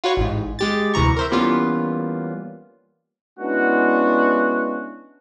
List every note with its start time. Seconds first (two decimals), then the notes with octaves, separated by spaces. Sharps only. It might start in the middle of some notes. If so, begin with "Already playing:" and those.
0.04 F4 F#4 B4 C#5
0.17 A1 G#2
0.59 G#3 G4 A6
0.94 D2 C3 E3 A#5 C#6
1.16 A#4 C5 E5
1.31 E3 G3 A#3 B3 C#4 F4
3.39 G#3 B3 C#4 D4 E4 F#4